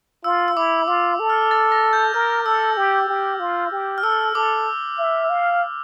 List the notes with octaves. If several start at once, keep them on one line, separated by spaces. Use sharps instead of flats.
F4 E6
E6
E4 D6
F4 D6
A4
F6
A6
A#6
G6
A#4 F6
A4 E6
G4
G4
F4
G4
F6
A4 E6
A4 D6
E5
F5